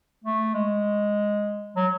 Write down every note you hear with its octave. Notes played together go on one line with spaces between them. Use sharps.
A3
G#3
F#3